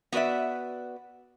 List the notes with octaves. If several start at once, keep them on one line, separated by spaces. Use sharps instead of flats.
B3 F#4 B4 D5 E5